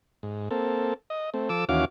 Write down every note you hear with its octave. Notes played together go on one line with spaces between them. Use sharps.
G#2
A#3 C4 A4
D#5
A3 C4
F3 A4 D6 E6
D#2 E3 C#4 F#4 F5 D6